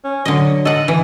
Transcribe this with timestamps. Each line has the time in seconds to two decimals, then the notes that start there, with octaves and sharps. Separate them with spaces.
0.04 C#4
0.25 D3 F#3 D#5
0.65 A4 D#5 F#5
0.88 E3